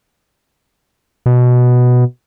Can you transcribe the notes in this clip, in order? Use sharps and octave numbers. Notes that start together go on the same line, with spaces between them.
B2